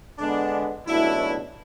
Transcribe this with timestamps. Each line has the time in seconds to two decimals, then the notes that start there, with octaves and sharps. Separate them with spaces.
0.19 D3 G#3 B3 D4
0.87 C#2 B2 F#3 A3 D4 E4